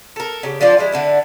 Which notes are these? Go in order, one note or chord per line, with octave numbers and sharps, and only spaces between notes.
A4 A#4
C#3 G4
F3 D4 F4 D5
G3 G#3 E4
D3 D4 E4